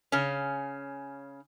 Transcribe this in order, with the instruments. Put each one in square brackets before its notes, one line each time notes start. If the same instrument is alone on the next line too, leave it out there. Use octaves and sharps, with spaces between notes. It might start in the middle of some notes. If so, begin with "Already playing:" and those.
[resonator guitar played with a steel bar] C#3 C#4